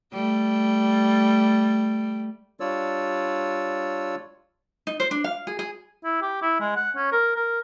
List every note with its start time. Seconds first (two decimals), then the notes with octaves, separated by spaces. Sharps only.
0.13 G3 A3
2.60 G3 D4 F4 C#5 D5 E6
4.87 D#4
5.00 C5
5.11 D4
5.24 F5
5.47 G#4
5.59 G#4
6.04 E4
6.22 G4
6.42 E4
6.60 G#3
6.76 F#5
6.96 C#4
7.12 A#4
7.36 A#4